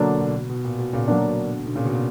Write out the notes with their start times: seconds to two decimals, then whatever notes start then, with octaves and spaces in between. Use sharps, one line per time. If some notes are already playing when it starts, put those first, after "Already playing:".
Already playing: B2 D3 F#3 A#3 D4
0.20 B2
0.35 B2
0.50 B2
0.64 A#2
0.79 B2
0.93 A#2 C#3
1.07 B2 D3 F#3 A#3 D4
1.66 B2 D3
1.75 A#2 C#3
1.85 B2
1.95 A#2